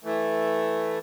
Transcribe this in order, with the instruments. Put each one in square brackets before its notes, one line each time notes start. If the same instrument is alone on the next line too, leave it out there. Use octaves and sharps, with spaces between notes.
[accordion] E3 A3